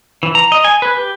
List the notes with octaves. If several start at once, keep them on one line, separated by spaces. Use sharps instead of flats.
E3
A#5
D#5
G#5
B4
G4